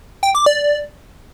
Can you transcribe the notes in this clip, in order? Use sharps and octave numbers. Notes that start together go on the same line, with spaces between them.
G5
D6
D5